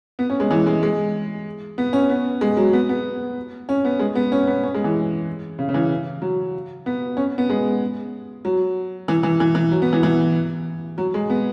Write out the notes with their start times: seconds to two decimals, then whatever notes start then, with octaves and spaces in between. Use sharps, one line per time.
0.19 B3
0.30 C#4
0.40 G#3
0.51 E3
0.67 G#3
0.83 G#3
1.78 B3
1.93 C#4
2.10 B3
2.41 G#3
2.57 F#3
2.73 B3
2.89 B3
3.69 C#4
3.85 B3
3.99 G#3
4.15 B3
4.32 C#4
4.47 B3
4.63 C#4
4.74 G#3
4.84 E3
5.59 C#3
5.69 C#3
5.74 E3
6.22 F#3
6.86 B3
7.17 C#4
7.38 B3
7.50 G#3
8.45 F#3
9.08 E3
9.23 E3
9.40 E3
9.55 E3
9.72 F#3
9.82 B3
9.93 E3
10.03 E3
10.98 F#3
11.14 G#3
11.30 B3